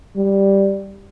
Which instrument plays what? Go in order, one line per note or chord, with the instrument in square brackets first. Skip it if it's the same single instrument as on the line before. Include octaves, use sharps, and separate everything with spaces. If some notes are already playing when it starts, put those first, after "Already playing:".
[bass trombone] G3